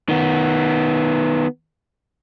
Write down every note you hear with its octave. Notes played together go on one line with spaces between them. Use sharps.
D#3 B3